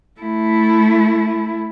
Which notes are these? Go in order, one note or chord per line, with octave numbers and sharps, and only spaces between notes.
A3 E4